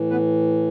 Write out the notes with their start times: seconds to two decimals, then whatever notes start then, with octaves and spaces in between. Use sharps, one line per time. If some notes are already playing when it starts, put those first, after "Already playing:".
Already playing: A2 E3
0.10 B3 B4